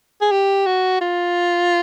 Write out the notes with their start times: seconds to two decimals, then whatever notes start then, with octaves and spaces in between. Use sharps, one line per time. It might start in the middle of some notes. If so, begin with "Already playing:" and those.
0.21 G#4
0.31 G4
0.66 F#4
1.01 F4